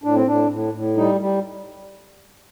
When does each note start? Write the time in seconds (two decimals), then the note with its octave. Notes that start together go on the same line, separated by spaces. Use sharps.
0.04 A2 D4
0.15 C4
0.27 A2 D4
0.50 A2
0.74 A2
0.97 G3 D#4
1.21 G3